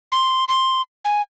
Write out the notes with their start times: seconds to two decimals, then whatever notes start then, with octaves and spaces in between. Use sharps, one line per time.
0.12 C6
0.48 C6
1.05 G#5